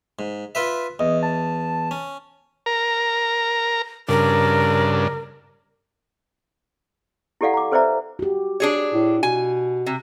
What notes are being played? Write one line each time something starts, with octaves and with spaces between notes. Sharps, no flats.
G#2
F4 B4 E5
E2 D#5
A5
C#4
A#4 A#5
G2 C#3 D4 A#4
E4 G4 A4 D5 F5 F#5
A#5 D6
A4 B4 C5 D5 E5 A#5
F#4 G4
D4 G#4 C#5
A2
B2 G#5
C3